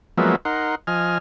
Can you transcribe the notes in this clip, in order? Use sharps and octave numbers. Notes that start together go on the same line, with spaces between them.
F3 F#3 G#3 A#3 B3 E5
D#4 A#4 F#5 C6
F3 D#5 G#5 F6